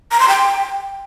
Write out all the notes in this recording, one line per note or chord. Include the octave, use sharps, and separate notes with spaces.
A#5
C6
G5